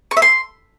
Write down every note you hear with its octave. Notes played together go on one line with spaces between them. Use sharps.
C#6
E5
C6